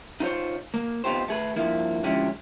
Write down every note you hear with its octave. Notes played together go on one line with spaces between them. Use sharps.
D#4 F4 A#4 C5 C#5
A#3
B3 C4 D#4 F4 G4 C5
A3 G#4 B4
G2 F3 A#3 E4
D3 F3 G#3 C#4 E4 G4